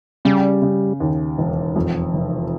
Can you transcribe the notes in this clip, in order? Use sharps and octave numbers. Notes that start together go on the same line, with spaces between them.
C#3 G3
C#3
D#2
E1
F2
F1